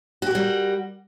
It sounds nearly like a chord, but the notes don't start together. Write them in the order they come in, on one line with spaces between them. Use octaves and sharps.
F#4 G4 A#4 G3